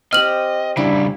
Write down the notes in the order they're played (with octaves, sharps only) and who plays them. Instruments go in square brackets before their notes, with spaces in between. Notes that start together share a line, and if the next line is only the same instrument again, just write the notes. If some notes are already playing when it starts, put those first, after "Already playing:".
[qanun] C4 G4 [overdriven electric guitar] D#5 [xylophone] F6 F#7
[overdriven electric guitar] C#3 G3 [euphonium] D4 [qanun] E4